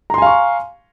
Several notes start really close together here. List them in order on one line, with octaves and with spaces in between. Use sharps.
A#5 C6 G#5 F5 C#6